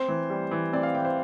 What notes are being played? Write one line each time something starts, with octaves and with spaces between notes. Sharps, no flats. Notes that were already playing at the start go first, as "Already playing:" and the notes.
Already playing: C4 C5
E3
G3
E3
C4 D5
F5
E3 G5
C5